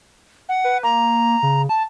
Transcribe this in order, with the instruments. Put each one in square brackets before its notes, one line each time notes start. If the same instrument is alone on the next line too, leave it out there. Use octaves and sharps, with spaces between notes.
[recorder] F#5
[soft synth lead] B4
[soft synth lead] A#3 [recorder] A#5
[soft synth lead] C#3
A5